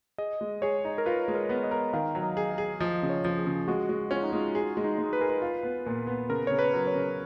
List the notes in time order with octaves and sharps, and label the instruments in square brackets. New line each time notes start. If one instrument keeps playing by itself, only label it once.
[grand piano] G#4 [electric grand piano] D#5
[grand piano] G#3
[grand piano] G#4 [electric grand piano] C#5
[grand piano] D#4
[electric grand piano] A#4
[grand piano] F4 [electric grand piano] B4
[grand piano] G#3
[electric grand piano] A#4
[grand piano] B3
[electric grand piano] D#5
[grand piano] A#4
[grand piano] D#3 [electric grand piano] F5
[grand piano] F#3
[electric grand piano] D#5
[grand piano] G#4
[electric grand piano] F5
[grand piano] G#4
[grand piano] F3 [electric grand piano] D#5
[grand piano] C#3
[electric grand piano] C#5
[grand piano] F3
[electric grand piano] G#4
[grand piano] C#3
[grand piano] G#3 [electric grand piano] F#4
[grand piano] G#3
[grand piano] C#4 [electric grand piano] F4
[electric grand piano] D#4
[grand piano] G#3 [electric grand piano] F4
[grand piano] G#4
G#3
[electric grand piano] D#4
[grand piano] G#3
[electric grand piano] B4
[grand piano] G#4 [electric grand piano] A#4
[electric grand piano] B4
[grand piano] F4
B3
A#2
B3
[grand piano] C#3 [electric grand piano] A#4
[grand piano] C#3 [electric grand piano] C#5
[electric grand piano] B4
[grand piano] F#3
[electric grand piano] C#5
[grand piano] C#3